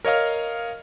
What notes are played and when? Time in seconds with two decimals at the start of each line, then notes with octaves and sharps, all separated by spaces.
0.04 A#4 C#5 D#5 F5 F6